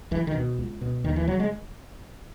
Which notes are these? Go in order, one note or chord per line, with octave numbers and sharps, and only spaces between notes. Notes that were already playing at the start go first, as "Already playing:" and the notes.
C#2 E3
D#3
B2
C#2
B2
D#2 D#3
E3
C#3 F#3
G#3